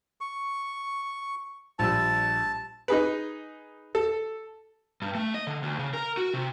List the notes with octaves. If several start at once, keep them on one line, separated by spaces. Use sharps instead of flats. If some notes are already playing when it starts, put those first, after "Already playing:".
C#6
A#1 G3 A5 E6
D#4 G#4 B4
A4
G2
A3
D#5
D3
D2
C#3
A#4
F#4
C3